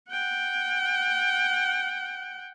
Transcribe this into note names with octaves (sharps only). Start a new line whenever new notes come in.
F#5 G5